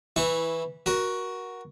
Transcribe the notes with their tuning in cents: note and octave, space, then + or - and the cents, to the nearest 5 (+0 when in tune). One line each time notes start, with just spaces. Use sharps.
E3 +0 E4 -15 C#6 +0
F#4 +0 A#4 +20